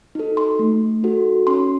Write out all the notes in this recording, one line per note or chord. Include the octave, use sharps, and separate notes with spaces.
D#4 F#4 A4
C6
A3
D#4 F#4 A4
C#4 C6